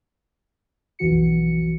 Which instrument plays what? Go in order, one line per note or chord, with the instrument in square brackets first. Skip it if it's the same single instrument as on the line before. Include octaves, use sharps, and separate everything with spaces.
[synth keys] B1 F2 E3 F#4 C#7